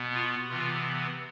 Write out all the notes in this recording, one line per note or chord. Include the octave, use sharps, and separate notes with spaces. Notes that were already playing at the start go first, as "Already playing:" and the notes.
Already playing: B2 B3
F4
C3 E3 B3 F4